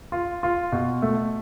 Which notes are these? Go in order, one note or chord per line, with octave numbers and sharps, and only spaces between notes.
F4
F4
B2
A3